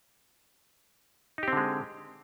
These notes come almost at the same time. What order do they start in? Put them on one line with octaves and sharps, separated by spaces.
D#4 G4 C4 D3 G#3